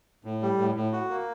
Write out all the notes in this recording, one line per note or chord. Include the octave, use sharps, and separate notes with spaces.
A2
G3
A2
A2
F#4
A#3